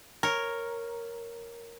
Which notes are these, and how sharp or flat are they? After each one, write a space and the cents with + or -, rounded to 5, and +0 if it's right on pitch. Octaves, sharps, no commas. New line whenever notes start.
A#4 +0 C#5 -5